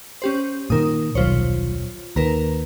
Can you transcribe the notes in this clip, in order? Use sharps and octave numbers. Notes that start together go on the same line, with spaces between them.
C#4 G4 C5
A#2 D#3 A#4 D#6
D#1 B1 F4 C5 C#5
D#2 A#4 B4 A#5